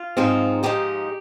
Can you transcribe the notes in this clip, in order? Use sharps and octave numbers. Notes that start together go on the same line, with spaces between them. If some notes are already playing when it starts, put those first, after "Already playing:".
Already playing: F4
G#2 F3 G#3 C4 D#4
G#2 F3 G#3 C4 D#4 G4